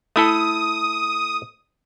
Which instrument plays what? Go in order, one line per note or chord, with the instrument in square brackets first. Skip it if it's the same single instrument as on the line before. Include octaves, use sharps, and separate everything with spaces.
[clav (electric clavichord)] A3 E4 A4 [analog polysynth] D#6